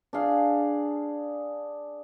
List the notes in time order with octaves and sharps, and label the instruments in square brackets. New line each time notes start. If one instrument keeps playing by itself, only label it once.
[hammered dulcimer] D4 G#4 F5